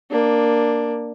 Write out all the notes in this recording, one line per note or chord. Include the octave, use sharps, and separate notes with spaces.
A#3 D4